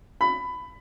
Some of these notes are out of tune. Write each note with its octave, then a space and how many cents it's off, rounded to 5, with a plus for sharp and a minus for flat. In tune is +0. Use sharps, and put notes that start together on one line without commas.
B5 +15